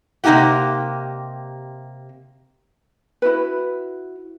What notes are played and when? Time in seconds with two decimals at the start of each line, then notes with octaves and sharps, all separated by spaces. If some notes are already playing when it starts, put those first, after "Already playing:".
0.24 C3 A#3 D#4 F4 G4 F#5
3.22 E4 F#4 B4